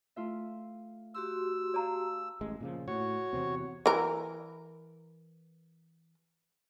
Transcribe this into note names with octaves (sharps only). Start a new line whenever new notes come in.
A3 F4 E5
F#4 G4 C6 E6
D5 F5 A5 A#5 D6
A1 G#3
A#2 C#3 F3
A2 F#4 C#5
E2 C3 C4
E3 A#4